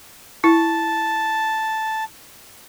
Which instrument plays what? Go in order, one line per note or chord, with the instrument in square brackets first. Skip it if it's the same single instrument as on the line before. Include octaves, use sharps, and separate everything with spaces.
[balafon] E4 [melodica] A5